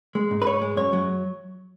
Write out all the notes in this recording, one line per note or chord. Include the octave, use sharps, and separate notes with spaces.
G#3
G#2
B4
G#2 C#5
G#3
F#2 C#5
F#3